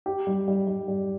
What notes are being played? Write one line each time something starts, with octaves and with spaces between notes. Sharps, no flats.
G4
G3
G3
G3
G3